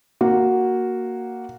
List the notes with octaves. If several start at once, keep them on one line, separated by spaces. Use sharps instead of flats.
A#3 F#4